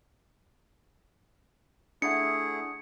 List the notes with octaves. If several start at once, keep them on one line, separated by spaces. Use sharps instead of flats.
A3 D4 E4 G#4 F#5 C#7